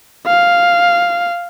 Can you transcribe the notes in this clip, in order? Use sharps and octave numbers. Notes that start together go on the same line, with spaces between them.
F5